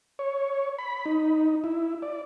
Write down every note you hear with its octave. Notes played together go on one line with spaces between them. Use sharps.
C#5
B5
D#4
E4
D5